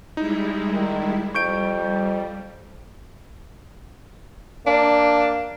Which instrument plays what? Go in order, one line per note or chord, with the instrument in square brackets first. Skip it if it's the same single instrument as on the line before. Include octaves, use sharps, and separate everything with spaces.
[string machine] G3 G#3 E4 [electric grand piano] D#4
[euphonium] D#3
[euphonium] F2 [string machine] G3 [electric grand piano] C#6 G6 D7
[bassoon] A#3 [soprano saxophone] D4